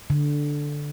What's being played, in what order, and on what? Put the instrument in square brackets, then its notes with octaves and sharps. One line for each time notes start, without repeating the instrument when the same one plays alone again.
[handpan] D3